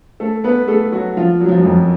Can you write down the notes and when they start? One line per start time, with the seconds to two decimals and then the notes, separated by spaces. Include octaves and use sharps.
0.20 A3 A4
0.44 B3 B4
0.68 A3 A4
0.92 F#3 F#4
1.17 F3 F4
1.40 F#3
1.48 F3
1.56 F#2 F#3
1.65 F2 F3